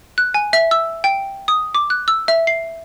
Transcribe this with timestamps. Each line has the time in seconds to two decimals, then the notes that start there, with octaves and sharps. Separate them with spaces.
0.18 F#6
0.34 G#5
0.53 E5
0.71 E6
1.04 G5
1.48 D#6
1.75 D6
1.90 F#6
2.08 E6
2.28 E5
2.47 C7